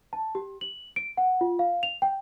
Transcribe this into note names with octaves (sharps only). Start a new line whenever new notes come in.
A5
G4
F#7
D7
F#5
F4
F5
F7
G5